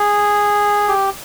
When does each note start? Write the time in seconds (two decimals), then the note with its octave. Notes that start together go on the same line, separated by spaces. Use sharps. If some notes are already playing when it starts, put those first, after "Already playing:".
Already playing: G#4
0.88 G4